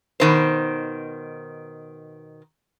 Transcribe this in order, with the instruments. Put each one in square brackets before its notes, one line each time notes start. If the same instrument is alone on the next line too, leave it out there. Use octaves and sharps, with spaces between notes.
[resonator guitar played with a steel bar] B2 D#3 C5